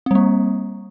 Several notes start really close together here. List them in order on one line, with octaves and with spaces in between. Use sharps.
C4 G3 A#3